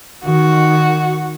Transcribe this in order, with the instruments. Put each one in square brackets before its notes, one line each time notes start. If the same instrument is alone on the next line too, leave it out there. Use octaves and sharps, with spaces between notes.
[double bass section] D#3 [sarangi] F#4